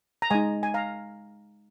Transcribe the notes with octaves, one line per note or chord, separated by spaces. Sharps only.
A#5
G#3 D#4 D#5 G#5
G#5
F5 A#5